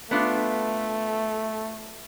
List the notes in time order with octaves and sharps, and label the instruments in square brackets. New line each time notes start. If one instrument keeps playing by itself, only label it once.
[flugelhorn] A3 [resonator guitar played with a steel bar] B3 D4 F4